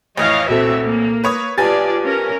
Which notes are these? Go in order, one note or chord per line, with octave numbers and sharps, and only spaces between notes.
A1 F2 E3 C#5 D#5 F5
C2 A#2 C4 F#4 A4 E5
A#3
B4 C#5 D#6
B1 F4 G4 B4 D5 G#5 A5 A6
C#4 A#4